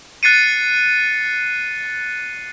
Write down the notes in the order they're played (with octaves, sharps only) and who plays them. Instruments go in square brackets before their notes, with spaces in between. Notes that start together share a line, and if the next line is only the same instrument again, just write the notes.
[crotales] F#6 A6 C7 C#7 D#7